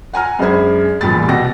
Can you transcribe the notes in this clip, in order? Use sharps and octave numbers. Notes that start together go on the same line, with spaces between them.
F#5 G#5 A#5 F6
F#2 G#3 D4 C5 B5 G#6
A1 E2 A#2 G3 B5 A6
B2 F#4 G4 E6 A#6